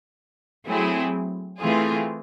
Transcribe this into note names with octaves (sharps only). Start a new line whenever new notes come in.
F#3 A3 C4 E4 G#4
E3 A3 C4 F4 G#4